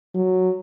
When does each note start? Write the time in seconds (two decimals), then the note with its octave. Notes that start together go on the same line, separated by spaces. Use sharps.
0.15 F#3